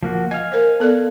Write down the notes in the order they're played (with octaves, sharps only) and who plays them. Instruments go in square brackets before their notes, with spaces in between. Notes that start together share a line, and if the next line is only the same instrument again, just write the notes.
[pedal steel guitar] F3 A#3 F#4
[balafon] D#5 [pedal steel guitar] F5 G#5
[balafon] A#4 C5
B3 A4 D5